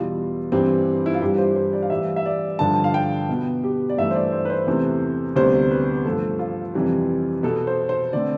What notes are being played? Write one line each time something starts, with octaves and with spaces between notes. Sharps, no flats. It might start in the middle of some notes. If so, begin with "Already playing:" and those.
Already playing: E2 B2 G3 F4
G2 E3 G3 C4
E4
F4
G2 E3 G3 G4
C5
C5
D5
F5
A2 E3 G3 E5
E5
D5
G2 D3 F3 A5
F5
G5
B2 B3
G4
D5
G2 E3 A3 E5
C5
D5
C5
B4
C5
E2 C3 E3 A3
D2 C3 G3 B3 C5
B4
G2 F3 A3 A4
F4
F2 C3 E3 G3
B2 B3 A4
C5
C5
D3 A3 C4 D5